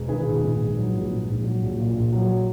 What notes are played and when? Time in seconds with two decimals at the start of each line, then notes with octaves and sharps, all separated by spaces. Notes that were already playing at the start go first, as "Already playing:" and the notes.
Already playing: E1
0.08 D#3 G#4 B4
0.26 A#1
0.43 G#2
0.60 A#1
0.77 F#3
0.94 A#1
1.11 G#2
1.27 A#1
1.44 F#3
1.62 A#1
1.79 A#2
1.95 A#1
2.13 F#3